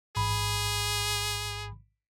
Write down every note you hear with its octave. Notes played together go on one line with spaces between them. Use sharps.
A1 G#2 G#4 B5